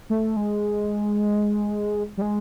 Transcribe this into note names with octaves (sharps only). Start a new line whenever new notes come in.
A3
G#3
G3
G#3